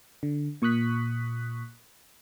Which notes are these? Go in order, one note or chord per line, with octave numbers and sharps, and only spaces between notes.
D3
A#2 C#6 D#6 F#6 B6